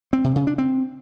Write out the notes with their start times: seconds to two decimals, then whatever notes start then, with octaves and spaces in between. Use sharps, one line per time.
0.13 C4
0.24 C3
0.36 C#3
0.47 D4
0.58 C4